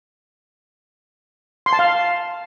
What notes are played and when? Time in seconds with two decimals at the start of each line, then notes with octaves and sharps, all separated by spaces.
1.66 C6
1.73 A5
1.79 F5